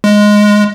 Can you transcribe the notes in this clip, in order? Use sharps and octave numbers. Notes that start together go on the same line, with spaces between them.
G#3